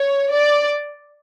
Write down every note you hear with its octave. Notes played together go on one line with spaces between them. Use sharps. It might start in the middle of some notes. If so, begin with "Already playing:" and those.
Already playing: C#5
D5